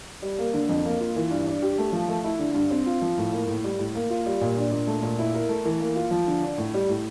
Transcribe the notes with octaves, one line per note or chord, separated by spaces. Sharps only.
G3
A#3
D3
F2
A#3
F4
E3
G2
D4
G4
A3
F3
A3
E4
D3
G2
C4
F4
F3
A2
A#3
A2
G3
A2
A#3
F4
G3
A#2
D4
A#2
A3
A#2
E4
A#4
A3
E3
A#3
F4
F3
D3
D4
A2
G3
A2